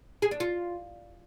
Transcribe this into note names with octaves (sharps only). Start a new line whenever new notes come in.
G#4
D4
F4